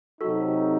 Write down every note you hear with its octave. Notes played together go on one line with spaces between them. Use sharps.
C3 F#3 C4 D#4 F#4 A4